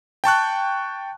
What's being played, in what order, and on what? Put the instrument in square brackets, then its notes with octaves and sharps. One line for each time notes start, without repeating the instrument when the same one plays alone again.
[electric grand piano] G5 A5 C#6 F#6